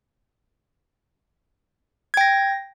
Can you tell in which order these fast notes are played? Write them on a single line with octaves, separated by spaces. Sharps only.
G#6 G5 A#6